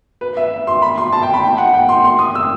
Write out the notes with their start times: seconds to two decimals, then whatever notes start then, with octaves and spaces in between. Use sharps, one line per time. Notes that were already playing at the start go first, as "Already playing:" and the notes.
0.21 B4
0.37 E5
0.67 C6
0.82 B5
0.98 C6
1.13 A5
1.23 G5
1.34 B5
1.44 G5
1.58 F#5
1.74 G5
1.89 C6
2.04 C6
2.19 D#6
2.35 E6